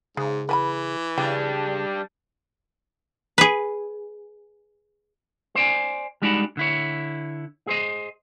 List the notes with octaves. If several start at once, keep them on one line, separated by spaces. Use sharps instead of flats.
G#2 C#3 G#4
E3 B4 G#5 B5
C#3 G3 D4 G5
G#4 B4
C5 D5 G#5
G3 G#3 D4 D#4 F#4 B5
D3 E4 C#5
G#4 C5 D#5